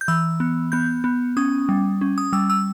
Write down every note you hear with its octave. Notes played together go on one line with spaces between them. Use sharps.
G6
E3 E6
B3
B3 G6
B3
C#4 D#6
G3
C#4
D#6
G3 E6
E6